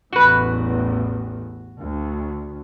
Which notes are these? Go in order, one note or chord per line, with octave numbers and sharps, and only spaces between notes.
A1 E2 A2 F#4 B4
D2